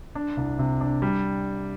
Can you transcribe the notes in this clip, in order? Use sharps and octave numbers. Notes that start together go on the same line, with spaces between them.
D4
C2
C3
D4
G3